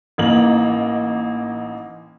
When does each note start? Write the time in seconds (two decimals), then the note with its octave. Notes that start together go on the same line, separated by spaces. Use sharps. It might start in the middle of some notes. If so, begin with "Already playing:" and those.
0.18 A1 A#3 D#4 F#7